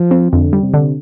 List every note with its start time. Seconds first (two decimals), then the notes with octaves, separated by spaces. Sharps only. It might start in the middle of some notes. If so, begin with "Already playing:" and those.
Already playing: F3
0.11 C4
0.32 F2 D3
0.53 G3
0.63 C3
0.74 D3